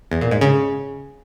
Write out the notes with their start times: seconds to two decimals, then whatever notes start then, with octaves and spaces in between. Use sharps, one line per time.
0.11 E2
0.21 A#2
0.31 G#2
0.41 C#3